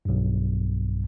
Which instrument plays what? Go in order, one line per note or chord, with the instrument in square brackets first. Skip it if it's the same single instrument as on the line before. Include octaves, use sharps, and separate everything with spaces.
[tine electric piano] B1 G2